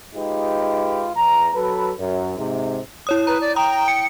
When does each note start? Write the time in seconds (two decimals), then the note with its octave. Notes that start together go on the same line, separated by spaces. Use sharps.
0.16 G#3 D#4 F4 G4 B4
1.16 E2 A#5
1.55 F#3 A4 B4
2.00 F#2
2.37 G#2 C3
3.07 E4 C#5 D#6
3.27 B4 A#5
3.41 D5
3.56 G5 A#5 D#6
3.88 C#7